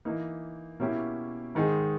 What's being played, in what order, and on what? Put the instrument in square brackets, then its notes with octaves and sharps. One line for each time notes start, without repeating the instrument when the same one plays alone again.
[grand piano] E3 A#3 D#4
B2 A#3 C#4 E4 G4
G#2 D#3 G#3 D#4 G#4